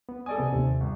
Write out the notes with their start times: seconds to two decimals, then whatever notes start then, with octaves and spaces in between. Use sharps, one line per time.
0.09 B3
0.26 A4 D5 G#5 D#6
0.38 C3 B3
0.53 D#2 C3
0.80 G1